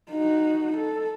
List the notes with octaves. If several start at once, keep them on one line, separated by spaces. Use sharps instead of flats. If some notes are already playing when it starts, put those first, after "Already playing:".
D#4 F#4
A4